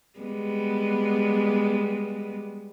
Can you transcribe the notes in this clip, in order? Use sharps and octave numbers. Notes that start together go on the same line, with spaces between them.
G3 G#3 B3